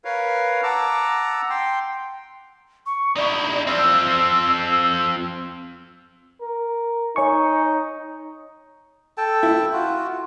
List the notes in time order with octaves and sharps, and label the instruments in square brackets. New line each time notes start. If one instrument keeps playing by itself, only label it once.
[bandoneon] A#4 B4 C#5 F5
F#5 A5 A#5 D6 E6
G5 C6
[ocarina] C#6
[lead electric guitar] D#4 E4 [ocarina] D5
[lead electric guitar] F3 C4 [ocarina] E6
[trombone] A#4
[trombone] D#4 [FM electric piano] C#5 G#5 C#6
[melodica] A4 G5 A5
[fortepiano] E4
[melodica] F4 F#4